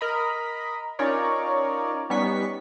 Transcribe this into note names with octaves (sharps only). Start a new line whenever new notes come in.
A#4 D#5 A#5 B5
C#4 D#4 F4 A#4 C#5 D5
G3 B3 C#4 D#4 C#6 B6